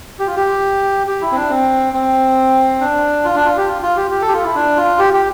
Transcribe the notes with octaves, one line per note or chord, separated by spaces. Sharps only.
G4
F4
G4
G4
E4
C4
D4
C4
C4
D4
F4
D4
F4
G4
F4
F4
G4
G4
A4
G4
F4
E4
D4
F4
G4
G4